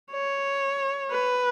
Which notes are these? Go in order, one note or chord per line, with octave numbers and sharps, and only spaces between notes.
C#5
B4